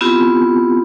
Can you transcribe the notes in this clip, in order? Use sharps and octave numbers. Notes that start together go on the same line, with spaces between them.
B3 C4 E4 F4 G4